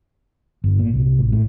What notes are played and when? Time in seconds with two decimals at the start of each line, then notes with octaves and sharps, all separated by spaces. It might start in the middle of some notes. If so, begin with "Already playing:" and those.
0.64 G1
0.79 A#2
0.94 C2
1.19 A1
1.32 A2